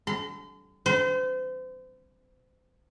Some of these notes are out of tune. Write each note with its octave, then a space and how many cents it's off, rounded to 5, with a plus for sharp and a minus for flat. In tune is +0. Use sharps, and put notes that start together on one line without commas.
C6 -40
C5 -35